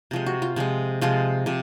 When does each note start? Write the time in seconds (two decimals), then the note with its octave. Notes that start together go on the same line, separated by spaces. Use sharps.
0.11 C3 F3 G#3
0.26 F#4
0.42 F4
0.56 C3 F3 G#3
1.01 C3 F3 G#3 F4
1.46 C3 F3